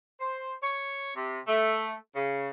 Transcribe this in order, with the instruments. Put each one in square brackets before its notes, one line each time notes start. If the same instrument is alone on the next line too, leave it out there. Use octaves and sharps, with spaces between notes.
[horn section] C5
C#5
C3
A3
C#3